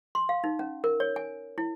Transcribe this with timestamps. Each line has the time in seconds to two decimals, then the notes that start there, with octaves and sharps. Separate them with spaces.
0.15 C6
0.29 F5
0.44 D#4
0.59 C#4
0.84 A#4
1.00 C#5
1.16 G#5
1.58 E4